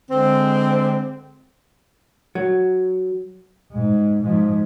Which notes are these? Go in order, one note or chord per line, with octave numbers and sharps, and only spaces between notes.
D3 G#3 C4
F#3
G#2
G#2 F3